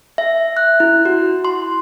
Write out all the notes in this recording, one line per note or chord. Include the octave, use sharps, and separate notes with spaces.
E5
F#6
E4
F#4
C6